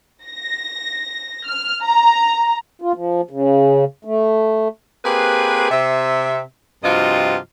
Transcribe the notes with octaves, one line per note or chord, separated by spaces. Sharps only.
A#6
F6
A#5
F4
F3
C#3
A3
A#3 C4 G4 G#4 B4
C3 E5
G2 C3 F3 F4 F#4 D#5